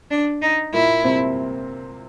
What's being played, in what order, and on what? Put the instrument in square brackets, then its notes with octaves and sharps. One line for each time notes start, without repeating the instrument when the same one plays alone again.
[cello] D4
D#4
[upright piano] A#2 A#3 [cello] E4
[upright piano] C3 C4